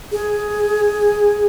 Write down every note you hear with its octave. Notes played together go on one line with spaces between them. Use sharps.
G#4